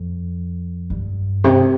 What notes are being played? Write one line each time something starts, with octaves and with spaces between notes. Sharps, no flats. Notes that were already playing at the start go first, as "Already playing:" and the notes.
Already playing: F2
G2
C3